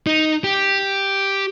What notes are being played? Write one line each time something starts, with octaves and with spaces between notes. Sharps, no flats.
D#4
G4